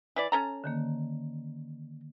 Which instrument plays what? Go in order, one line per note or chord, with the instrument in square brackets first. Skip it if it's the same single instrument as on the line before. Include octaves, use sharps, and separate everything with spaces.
[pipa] E3 E4 D5
C#4 A4 A#5
[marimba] D3 D#3 A#3